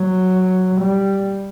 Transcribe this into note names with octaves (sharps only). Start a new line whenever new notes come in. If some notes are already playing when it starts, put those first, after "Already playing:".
Already playing: F#3
G3